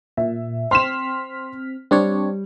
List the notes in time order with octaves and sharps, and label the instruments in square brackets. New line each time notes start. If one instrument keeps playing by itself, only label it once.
[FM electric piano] A#2 [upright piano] E5
[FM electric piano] C4 F6 B6 [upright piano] C6 E7
[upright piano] G3 [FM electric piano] C4 D4 C#5